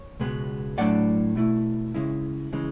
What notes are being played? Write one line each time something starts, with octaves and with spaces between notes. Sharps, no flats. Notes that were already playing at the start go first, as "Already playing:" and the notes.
Already playing: C#5
C#2 B2 G#3 B3
A2 F#3 A3 D4 D5 F#5
B2 A3 E4
C#3 G#3 C#4 E4
C#3 E3 G#3